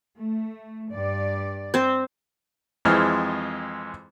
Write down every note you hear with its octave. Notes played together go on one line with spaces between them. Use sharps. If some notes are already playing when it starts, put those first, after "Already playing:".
A3
G2 D5
C4 C5
F2 E3 G#3 C4 C5 F6